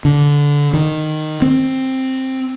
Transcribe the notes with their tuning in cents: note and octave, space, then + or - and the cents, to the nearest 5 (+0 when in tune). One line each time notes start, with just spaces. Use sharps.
D3 -20
D#3 -10
C4 +5